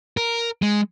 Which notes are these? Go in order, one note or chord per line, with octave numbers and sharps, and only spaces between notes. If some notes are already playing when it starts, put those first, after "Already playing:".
A#4
G#3